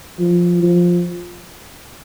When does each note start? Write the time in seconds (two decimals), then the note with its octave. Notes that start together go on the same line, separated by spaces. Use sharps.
0.19 F3
0.62 F3